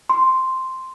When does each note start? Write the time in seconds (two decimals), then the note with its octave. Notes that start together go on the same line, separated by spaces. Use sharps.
0.09 C6